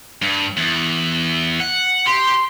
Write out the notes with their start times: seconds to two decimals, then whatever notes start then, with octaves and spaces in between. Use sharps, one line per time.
0.22 G2
0.57 E2
1.60 F#5
2.07 G4 C6